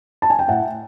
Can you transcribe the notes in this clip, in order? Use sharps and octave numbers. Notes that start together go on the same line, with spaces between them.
A5
G#5
G5
A2 E5 F#5